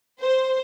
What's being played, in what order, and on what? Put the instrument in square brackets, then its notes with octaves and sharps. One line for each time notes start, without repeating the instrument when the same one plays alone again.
[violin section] C5